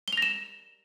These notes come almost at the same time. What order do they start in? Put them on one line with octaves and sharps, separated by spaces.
G7 F7 A#6 E7